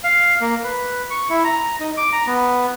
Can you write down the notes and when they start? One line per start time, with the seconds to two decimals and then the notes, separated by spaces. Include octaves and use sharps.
0.04 F5
0.41 A#3
0.64 B4
1.10 C#6
1.29 E4
1.44 A#5
1.80 D#4
1.97 D6
2.12 A#5
2.27 B3